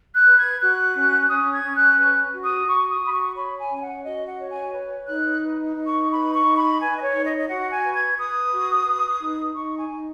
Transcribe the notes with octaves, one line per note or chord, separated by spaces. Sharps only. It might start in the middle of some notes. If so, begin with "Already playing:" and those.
F#6
B4
G#6
F#4 F#6
C#4
C#4 D#6
G#6
C#4
F#6
B4 F#6
F#4
D#6
F#4 C#6
D#6
F#4 B5
C#6
C#5 B5
G#5
C#4
G#5
F#5
F#4 D#5
F#5
C#5
G#5
B4
D#4 F#6
B4
D#4
C#6
B4 B5
C#6
D#4
B5
B4 G#5
D#5
C#5
D#4
D#5
D#5
F#4 F#5
G#5
B4
G#6
B4 D#6
F#4
B4
D#4
D#4 C#6
G#5
D#4